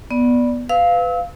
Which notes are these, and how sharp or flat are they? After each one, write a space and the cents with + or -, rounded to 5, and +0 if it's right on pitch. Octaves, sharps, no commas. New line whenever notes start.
B3 -10 D5 +0
B4 +25 F5 +0 E6 -30